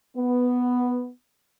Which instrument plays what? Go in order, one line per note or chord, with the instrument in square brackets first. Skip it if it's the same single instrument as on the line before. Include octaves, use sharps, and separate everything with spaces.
[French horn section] B3